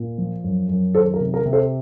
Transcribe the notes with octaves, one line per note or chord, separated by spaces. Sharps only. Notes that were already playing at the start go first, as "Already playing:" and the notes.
Already playing: A#2
F3
F#2
F#2
D#3 A4 C5
A#4
C3
A#4
C3
A4 C5